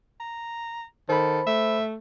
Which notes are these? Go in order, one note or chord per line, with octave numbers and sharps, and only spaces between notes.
A#5
D#3 A4 C5 B5
A3 E5